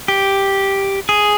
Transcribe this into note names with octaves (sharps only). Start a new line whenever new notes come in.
G4
G#4